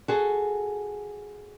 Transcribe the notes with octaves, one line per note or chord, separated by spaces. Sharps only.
F#4 G#4 A4